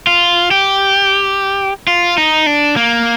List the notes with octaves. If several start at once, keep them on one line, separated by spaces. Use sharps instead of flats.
F4
G4
F4
D#4
D4
A#3